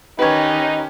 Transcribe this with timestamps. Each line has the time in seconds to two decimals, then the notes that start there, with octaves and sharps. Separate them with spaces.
0.19 D#3 C#4 D#4 G4 B4 C#5